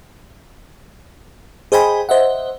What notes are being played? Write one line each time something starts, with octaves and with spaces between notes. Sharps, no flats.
G#4 C5 D#5 G5 G#5 B5
C5 D#5 E5 F#5